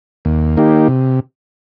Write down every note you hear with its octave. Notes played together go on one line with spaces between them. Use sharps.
D#2
D#3 A#3 D#4 G4
C3